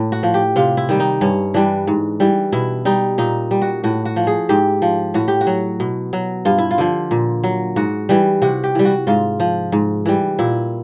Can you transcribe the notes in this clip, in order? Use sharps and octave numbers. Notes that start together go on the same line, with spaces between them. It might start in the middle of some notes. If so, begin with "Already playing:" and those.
Already playing: A2
F#4
F3
G4
C3 F4
E4
D#3 G3
D#4
G2 C#4
E3 G3 D4
G#2
E3 G3
B2 E4
G3 D#4
A#2 D#4
G3
F#4
A2 F#4
F#4
F3
G#4
G#2 G4
F3
A2 F#4
G4
F#4
F#3
B2
F#3
G2 F4
E4
F4
D3 F3
A#2
F#3
G#2 F#4
E3 G3
C3 F#4
G4
E3 G3
F#4
G#2 F4
F3
G#2
E3 G3
A#2 E4